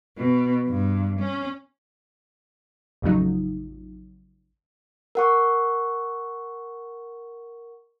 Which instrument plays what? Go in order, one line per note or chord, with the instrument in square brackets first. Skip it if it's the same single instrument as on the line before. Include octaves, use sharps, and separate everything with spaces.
[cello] B2
G2
C#4
[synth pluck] A1 F2 C#3 F#3 D#4
[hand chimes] A#4 F#5 C#6